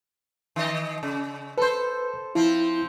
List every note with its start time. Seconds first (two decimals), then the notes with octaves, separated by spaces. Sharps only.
0.56 D#3 D#5
1.03 C#3
1.58 A4 B4 C5
2.35 F3 C4 E4